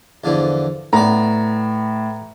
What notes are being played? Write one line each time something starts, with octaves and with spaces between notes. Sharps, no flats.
E2 D3 F3
A2 B3 D5 A#5